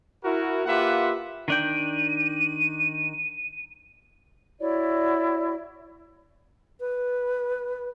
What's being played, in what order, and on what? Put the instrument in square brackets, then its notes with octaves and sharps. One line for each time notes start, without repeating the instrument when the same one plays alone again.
[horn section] E4 F#4 A#4
A#3 F4 G4 B4 E5 F#5
[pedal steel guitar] D#3 D4 G5 [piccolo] D#7
[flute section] E4 F#4 C#5 D5
[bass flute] B4